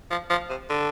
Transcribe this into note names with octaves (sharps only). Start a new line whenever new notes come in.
F3
F3
C3
D3